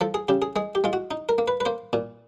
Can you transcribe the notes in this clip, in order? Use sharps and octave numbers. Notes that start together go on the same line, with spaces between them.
F3 A4
G#4
C#3 G4
G#4
G#3 G#4
G4
G#3 F4
F#4
D#4
A#4
A#3
B4
B4
A#3 C5
A#2